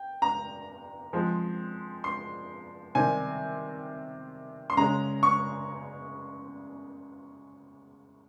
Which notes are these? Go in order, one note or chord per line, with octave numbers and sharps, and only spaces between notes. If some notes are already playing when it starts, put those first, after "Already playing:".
Already playing: G5
A#5
F3 G#3 C4
C6
C3 D#3 G3 C4 G#5
C6
C#3 G#3 C#4 A#5
C#6